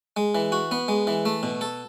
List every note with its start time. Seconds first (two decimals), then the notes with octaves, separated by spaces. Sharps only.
0.17 G#3
0.35 E3
0.52 F#4
0.71 B3
0.88 G#3
1.07 E3
1.26 A3
1.43 B2
1.61 A4